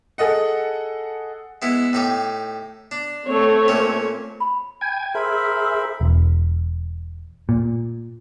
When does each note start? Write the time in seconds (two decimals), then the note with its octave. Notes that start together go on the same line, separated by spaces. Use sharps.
0.18 G#4 A4 D#5 F#5
1.62 G#3 B3 E4
1.93 A2 D#4 G4
2.91 D4
3.28 A3 C4 C#5
3.68 A#2 C#4
4.40 B5
4.81 G5 G#5 G#6
5.15 G#4 A#4 C5 E5 B5
6.01 E1
7.49 A#2